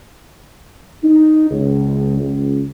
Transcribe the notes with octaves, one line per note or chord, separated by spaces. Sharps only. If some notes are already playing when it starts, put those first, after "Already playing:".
D#4
C#2
C#2